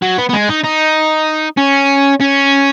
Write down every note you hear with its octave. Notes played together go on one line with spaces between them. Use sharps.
F#3
B3
B3
G#3
D#4
D#4
C#4
C#4